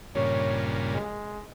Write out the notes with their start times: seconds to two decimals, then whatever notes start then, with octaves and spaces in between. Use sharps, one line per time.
0.15 G2 A#2 C#3 C#5
0.93 G#3